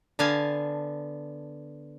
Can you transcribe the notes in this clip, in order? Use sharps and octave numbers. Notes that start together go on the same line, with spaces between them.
D3 B3 F5 G#5 A5